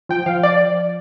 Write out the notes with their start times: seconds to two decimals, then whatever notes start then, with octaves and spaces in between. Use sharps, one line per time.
0.09 F3 G5
0.26 F3 F5
0.43 D5